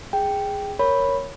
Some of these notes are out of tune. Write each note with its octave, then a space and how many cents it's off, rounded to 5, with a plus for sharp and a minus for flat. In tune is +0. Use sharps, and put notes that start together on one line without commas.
G#4 -10 G5 +0
A#4 +0 C#5 +0 B5 +0